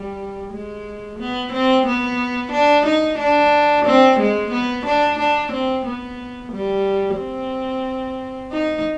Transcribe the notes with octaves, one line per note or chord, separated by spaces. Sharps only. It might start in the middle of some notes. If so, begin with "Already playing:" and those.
Already playing: G3
G#3
B3
C4
B3
D4
D#4
D4
C4
G#3
B3
D4
D4
C4
B3
G3
C4
D#4